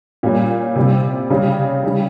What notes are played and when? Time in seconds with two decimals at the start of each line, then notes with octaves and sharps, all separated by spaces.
0.23 A#2 G3 C#4
0.76 C3 G3 C4
1.30 C#3 G3 C#4 G4
1.83 C#3 G3 C#4 G4